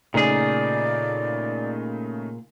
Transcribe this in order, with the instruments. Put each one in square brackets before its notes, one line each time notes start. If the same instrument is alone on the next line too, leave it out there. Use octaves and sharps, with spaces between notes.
[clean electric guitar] A#2 G#4 [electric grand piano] C#3 A3 D#4 [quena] D5